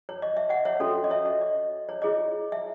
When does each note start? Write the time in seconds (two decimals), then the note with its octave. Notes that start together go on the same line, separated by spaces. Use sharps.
0.09 C#5
0.22 D#5
0.37 E5
0.49 D#5 F#5
0.65 C#5 E5
0.80 C#4 F#4 A4 C#5
1.04 D#5
1.10 C#5 E5
1.26 D#5
1.41 D#5
1.89 C#5
2.02 E4 G#4 C#5 D#5
2.52 E5